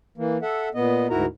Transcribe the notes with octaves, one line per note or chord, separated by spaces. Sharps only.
E3 A#3
A4 E5 F#5
A#2 B3 D#5
D2 G#2 E4 F#4 A#4 A#5